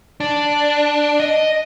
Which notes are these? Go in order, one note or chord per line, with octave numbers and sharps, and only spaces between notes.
D4
D#5